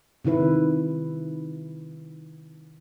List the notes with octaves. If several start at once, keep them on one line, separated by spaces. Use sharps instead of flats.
C3 D#3 E4 B4